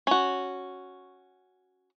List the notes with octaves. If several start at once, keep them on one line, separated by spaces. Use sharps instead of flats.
C#4 F#4